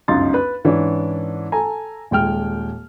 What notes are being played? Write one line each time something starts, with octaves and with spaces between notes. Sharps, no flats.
G1 C#2 F#2 D#4 C6 A6
B4
G#2 E3 C#4 D4
A4 G#5 A#5
D#1 G#3 G5 F6